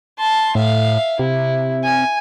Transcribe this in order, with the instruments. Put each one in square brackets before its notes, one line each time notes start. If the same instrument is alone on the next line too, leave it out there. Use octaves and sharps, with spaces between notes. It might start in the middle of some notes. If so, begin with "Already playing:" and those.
[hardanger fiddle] A5 C6
[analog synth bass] A2 [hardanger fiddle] E5 F5
[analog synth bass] C3 [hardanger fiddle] E4
[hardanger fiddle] G#5